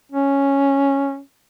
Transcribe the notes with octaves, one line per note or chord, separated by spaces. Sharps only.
C#4